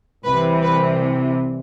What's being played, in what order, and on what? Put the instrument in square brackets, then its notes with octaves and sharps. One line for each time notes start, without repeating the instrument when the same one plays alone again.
[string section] C2 C3 E3 B4
B4